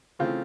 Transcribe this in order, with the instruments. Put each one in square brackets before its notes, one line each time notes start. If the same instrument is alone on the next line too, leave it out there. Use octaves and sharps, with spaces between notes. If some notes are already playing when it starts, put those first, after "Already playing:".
[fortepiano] C#3 E3 A3 C4 F4